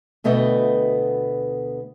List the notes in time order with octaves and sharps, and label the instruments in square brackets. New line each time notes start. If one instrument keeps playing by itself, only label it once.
[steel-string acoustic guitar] D2 B2 A3 B3 D#5 G5